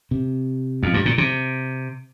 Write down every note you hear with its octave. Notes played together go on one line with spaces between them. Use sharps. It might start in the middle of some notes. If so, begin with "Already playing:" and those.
C3
F2
G2
A#2
C3